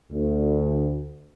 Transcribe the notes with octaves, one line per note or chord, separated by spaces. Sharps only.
D2